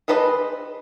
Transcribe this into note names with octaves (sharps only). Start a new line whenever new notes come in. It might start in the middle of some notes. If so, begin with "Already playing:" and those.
G#4 A4 B4 C5 D#5